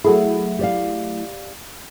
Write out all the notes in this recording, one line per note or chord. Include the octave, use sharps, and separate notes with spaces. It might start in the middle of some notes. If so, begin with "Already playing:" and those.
F#3 A3 E4 G#4 F#5
G4 D5 F5